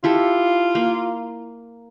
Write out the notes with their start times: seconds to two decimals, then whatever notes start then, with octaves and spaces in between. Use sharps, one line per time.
0.04 E4 F4 G4 A4
0.75 A#3